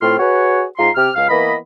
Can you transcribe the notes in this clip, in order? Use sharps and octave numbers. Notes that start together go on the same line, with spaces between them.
A2 A3 C4 F4 C6 F6
F#4 G#4 B4 C#5
G#2 F4 A#5 C6
C3 G4 F6
C#2 F5
E3 A#3 B3 D#5 B5